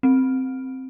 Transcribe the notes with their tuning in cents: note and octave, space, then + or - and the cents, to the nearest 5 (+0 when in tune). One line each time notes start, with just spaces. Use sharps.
C4 +0